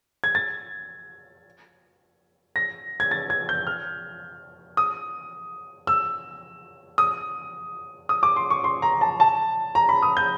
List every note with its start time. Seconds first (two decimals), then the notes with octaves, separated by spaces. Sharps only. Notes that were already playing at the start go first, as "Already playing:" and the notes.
0.24 G#6
0.35 A6
2.56 A#6
3.00 G#6
3.11 A6
3.30 G#6
3.49 G6
3.67 F6
4.77 D#6
5.87 E6
6.98 D#6
8.09 D#6
8.23 D6
8.36 C6
8.50 C#6
8.64 C6
8.82 A#5
9.01 A5
9.20 A5
9.75 A#5
9.89 B5
10.02 D#6
10.17 G6